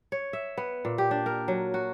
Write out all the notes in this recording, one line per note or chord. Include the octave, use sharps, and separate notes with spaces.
C#5
E5
B3
A#2
G4
D4
A#4
F#3
F#4